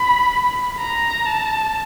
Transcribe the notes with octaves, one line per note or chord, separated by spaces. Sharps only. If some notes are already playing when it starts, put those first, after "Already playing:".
Already playing: B5
A#5
A5